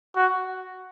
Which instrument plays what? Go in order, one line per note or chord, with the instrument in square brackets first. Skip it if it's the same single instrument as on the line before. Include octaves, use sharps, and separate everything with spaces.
[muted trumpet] F#4